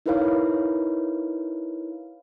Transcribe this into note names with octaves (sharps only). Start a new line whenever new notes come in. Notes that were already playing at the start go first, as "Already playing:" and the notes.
D#4 E4 A#4 B4 C#5 F5